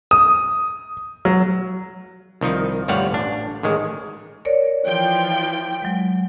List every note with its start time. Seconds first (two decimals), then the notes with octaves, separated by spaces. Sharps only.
0.11 D#6
1.25 F#3
2.41 C2 D#3 F3 D#4
2.88 G1 D2 G3 C#5 F5 F#5
3.12 A1 D4
3.63 A1 D#3 G#3
4.45 A#4 C#5 D5
4.86 E3 F3 G5
5.82 F#3 G#3